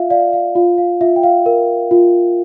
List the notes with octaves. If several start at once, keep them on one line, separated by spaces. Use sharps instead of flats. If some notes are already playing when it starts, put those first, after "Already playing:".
Already playing: F4 E5 F5
D5 F5
F5
F4 F5
F5
F4 E5
G5
F5
A#4
F4